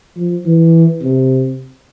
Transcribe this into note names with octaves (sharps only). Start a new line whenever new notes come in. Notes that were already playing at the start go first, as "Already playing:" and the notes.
F3
E3
C3